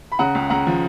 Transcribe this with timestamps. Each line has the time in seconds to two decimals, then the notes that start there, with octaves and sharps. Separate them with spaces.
0.12 B5
0.19 C#3 F#5 A#5
0.35 C#2
0.50 C#2 F#5 A#5
0.67 F3